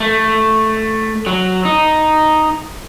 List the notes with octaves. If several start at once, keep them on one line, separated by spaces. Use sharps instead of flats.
A3
F#3
D#4